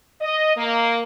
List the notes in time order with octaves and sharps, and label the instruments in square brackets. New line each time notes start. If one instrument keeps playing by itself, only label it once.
[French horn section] D#5
A#3